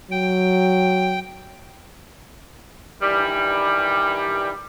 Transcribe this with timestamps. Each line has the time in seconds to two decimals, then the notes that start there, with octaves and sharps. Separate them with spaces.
0.11 F#3 G5
3.01 G2 D#3 E3 G3